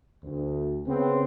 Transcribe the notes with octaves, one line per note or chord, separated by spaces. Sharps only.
D2
C#3 B3 C4